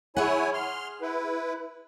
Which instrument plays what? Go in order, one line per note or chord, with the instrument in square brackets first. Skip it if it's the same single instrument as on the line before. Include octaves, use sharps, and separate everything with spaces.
[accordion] E4 C#5 G#5 [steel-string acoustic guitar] G#4 F#5
[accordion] C6 F6
E4 B4